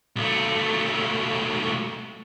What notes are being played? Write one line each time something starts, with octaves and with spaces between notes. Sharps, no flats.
B1 A3